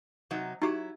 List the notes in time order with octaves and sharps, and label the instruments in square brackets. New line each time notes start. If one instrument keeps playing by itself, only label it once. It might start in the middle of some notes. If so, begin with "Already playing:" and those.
[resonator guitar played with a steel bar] C3 F#3 D#4
[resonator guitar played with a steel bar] F#3 E4 [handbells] D#4 F#4 G4